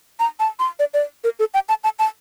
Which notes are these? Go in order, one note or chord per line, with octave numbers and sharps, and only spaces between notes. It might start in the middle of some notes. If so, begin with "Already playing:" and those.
A#5
A5
C6
D5
D5
A#4
A4
G5
A5
A5
A5